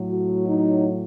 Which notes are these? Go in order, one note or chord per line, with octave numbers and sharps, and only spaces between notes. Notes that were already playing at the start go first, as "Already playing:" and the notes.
Already playing: A2 F#3
F#4
D#4